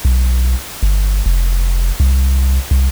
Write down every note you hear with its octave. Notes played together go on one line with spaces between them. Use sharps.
B1
G1
F1
C2
C2